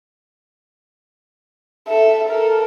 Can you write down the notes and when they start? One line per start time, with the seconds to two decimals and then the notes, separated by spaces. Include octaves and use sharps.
1.88 A4 E5
2.29 A4 A#4